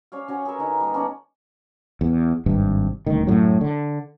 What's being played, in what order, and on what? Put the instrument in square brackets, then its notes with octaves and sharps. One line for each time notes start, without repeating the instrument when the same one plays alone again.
[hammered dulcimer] C#4 C#5 D5 F5
C#4 F#4 C#5
G#4 A#4 B4 E5
D3 D#4 A#4 G#5
G3 A#3
B3 C#4 D4 D5
[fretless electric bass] E2
G#1 G2 C3
D#1 D2 D#3
F#2 A2 F#3
D3